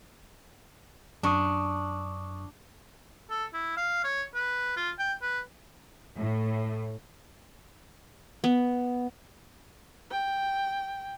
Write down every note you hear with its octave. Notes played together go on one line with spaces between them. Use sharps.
F#2 D4 C#6 D#6
A4
E4
F5
C#5
B4
F4
G5
B4
A2
B3
G5